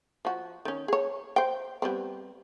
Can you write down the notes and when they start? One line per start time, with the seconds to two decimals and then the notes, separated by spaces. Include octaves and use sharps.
0.25 F3 F#4
0.65 D#3 C#4
0.88 G#4 C#5
1.36 C5 G5
1.82 G3 B3 C4